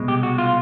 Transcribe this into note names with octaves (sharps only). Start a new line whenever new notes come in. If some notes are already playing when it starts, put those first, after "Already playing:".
Already playing: C2 B2 G#3
G4
F#4
F4